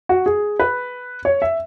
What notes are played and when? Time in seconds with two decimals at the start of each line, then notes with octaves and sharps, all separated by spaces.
0.09 F#4
0.26 G#4
0.60 B4
1.25 C#5
1.42 E5